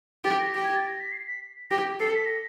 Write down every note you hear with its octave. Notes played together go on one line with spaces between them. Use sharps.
G4 A6
A#6
G4
G#6
A6
A#6
B6
C7
B6
G4 A#6
A4 C7
B6
A#6